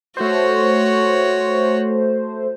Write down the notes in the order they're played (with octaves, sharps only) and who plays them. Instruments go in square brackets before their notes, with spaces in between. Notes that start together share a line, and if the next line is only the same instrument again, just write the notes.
[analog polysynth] A3 C5 [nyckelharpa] F#4 C#5